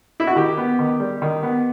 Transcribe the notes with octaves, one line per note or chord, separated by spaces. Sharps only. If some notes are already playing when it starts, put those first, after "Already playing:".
E4
F#4
D#3 G4
B3
D#3
G3
D#3
B3